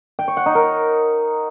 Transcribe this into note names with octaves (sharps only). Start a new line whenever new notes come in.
G5
C#5
F#5
D#4
A#4